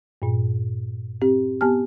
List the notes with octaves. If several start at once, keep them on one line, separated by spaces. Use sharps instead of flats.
G2 A#2
C4 G4
B3 G4 G#5 A5 F6